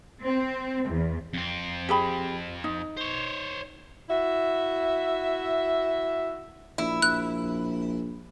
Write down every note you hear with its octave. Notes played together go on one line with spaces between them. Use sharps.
C4
E2
F2 C4
G4 G#4 B5
D#4
C5 C#5
E4 F#4 E5
A#1 E4
A#1 F#6